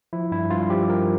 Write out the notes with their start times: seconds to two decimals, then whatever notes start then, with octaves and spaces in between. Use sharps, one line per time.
0.13 F3 E4
0.31 G2 E4
0.50 G2 F4
0.70 F3 G4
0.89 F3 A#4